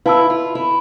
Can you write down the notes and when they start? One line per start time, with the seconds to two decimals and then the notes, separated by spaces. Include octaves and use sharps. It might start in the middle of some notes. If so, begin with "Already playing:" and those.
0.06 E4 B4 F5 A5 E6
0.30 F4
0.55 E4